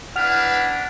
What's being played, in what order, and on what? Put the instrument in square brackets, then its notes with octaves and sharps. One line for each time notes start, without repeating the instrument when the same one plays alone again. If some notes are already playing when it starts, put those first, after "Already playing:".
[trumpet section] D4 E4 B4 [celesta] F#5 F6 F7